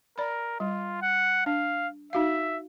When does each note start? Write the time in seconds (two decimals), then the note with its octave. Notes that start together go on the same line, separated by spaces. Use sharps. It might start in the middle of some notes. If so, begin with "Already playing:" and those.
0.18 A#4 D5 B5
0.60 G3 F4
1.02 F#5
1.46 D4 F5
2.13 D#4 F#4 E5 F5